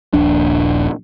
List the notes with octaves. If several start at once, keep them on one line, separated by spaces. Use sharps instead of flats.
D#1 A#1 D4